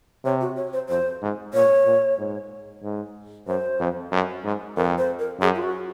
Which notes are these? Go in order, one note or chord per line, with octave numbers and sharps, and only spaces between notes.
C3 C#5
F#4
C#5
C5
F2 C5
G#2
A#2 C#5
A#2
G#2
G#2
F#2 C5
F2
F#2
G#2
F2 A#4
C5
A#4
F#2 G#4
F4
F#4